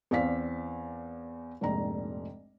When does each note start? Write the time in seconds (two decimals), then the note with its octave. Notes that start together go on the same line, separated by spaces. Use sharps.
0.11 E2 C4 D5 F5 B6
1.61 F1 A#1 G#2 A#5